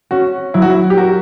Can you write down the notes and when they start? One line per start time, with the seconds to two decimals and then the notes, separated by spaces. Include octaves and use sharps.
0.11 C#4 F#4
0.54 F#3 E4
0.62 F#4
0.70 E4
0.90 G4
0.98 F#4 A#4